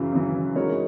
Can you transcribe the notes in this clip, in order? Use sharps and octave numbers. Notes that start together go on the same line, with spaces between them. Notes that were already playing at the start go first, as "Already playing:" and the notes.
Already playing: F#2 C#3 E3
F#2 C#3 E3
G#3 D#4 F#4 A#4 C#5